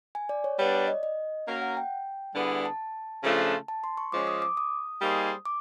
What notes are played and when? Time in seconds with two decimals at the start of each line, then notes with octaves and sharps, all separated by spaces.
0.15 G#5
0.29 D5
0.44 C#5
0.58 G3 B3 D4 C#5
0.74 D5
0.88 D#5
1.03 D#5
1.47 A#3 C#4 F#4 A#4
1.62 F#5
1.77 G5
2.35 D3 G3 B3 E4 G#4
2.66 A5
3.24 C#3 F3 A3 D4 F4
3.68 A5
3.84 C6
3.97 C#6
4.12 F3 G#3 C#4 D6
4.27 D#6
4.42 D6
4.57 D#6
5.01 G3 A#3 D#4 G#4 C5
5.46 D6